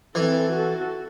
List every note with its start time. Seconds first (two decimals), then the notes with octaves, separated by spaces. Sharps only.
0.15 E3 C4 A4
0.53 F#4 A4